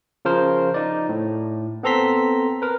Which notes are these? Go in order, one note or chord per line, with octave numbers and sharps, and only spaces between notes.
C#3 F3 A#4 C5
D#4 D5
A2
B3 C4 A4 A#5 C6 B6
A#4 B4